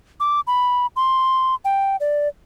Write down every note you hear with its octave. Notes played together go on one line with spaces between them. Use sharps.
D6
B5
C6
G5
D5